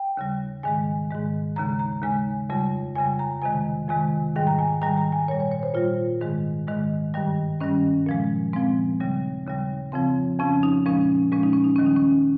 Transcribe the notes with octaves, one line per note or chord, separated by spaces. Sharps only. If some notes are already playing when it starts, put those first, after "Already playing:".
Already playing: G5
D#2 C#3 G3
G#2 D#3 G#3 G#5
G#2 D#3 G#3
D#2 C#3 G#3 A#5
A#5
D#2 C#3 G#3 G#5
F2 C#3 G3
F2 C#3 G3 G#5
A#5
F2 C3 D#3 G#3 G#5
F2 C3 D#3 G#3 G#5
G#2 D#3 G3 G5
A#5
G#5
G#2 D#3 G3 A#5
A#5
G#5
A#2 G3 C#5
C#5
C#5
C5
A#2 G3 F4
G#2 D#3 G#3
G#2 D#3 G#3
G2 D#3 G3
G2 D#3 G3 C#4
A#2 F3 G#3
A#2 F3 G#3 C4
D#2 C#3 G3
D#2 C#3 G3
F2 C#3 F3 C4
F2 C#3 F3 C#4
D#4
A#2 F3 G#3 C#4
A#2 F3 G#3 C#4
D#4
C#4
D#4
D#2 D#3 G3 C#4
D#4
C#4